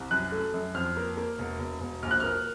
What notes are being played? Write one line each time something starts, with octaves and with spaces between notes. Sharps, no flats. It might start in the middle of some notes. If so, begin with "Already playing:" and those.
Already playing: C2
F#2 F#6
A3
F#2
F2 F6
A#3
A#3
E1
E1
E1
A#1 F6
F#6
A#3 F6